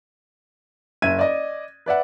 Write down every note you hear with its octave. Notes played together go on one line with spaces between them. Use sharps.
F#1 E5 G#6 D#7
D5 D#5
B4 D5 E5 F#5